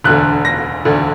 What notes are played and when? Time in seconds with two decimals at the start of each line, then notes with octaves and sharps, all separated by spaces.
0.04 E1 D2 D3 F#6
0.45 A#6
0.85 E1 D2 D3